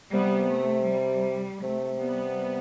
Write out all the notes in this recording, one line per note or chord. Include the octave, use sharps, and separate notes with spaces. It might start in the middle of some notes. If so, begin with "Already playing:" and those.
C3 G3 B3
A3
G3
C3 A3
G3 B3